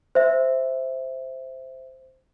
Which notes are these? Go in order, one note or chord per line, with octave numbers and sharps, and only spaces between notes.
C5 E5